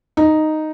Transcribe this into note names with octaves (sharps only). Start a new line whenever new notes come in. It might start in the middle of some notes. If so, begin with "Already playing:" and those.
D#4